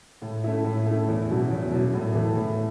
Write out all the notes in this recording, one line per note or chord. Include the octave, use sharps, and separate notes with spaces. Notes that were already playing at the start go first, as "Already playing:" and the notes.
A2
A3 C#4 E4
A2
A3 C#4 E4
E2
B2 F#3 C#4 E4
E2
B2 F#3 C#4 E4
A2
E3 A3
A2